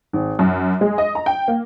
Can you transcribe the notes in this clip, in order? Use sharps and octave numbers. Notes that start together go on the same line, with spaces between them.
G#1
F#2
G#3
D#5
A#5
G5
A#3